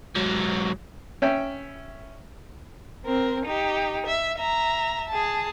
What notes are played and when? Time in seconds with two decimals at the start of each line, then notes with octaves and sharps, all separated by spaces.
0.15 G#2 F#3
1.22 C#4 E5 G5
3.05 C4 A#4
3.45 D#4 G4
4.06 E5
4.38 E5 A#5
5.09 G#4 A5